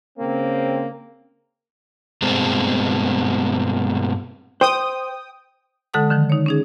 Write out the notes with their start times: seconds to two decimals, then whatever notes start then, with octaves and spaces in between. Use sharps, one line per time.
0.18 C#3 A#3 C4
2.22 G2 B2 G#3 C4
4.61 C5 G5 D#6
5.94 D3 G#3 A4 F#5 A5 D#6
6.10 D3 D#3 F3
6.30 D#4 C#5
6.46 C#4 D#4 G#4